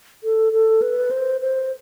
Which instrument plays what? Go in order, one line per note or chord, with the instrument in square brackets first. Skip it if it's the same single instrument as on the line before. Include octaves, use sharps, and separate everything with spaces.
[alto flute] A4
A4
B4
C5
C5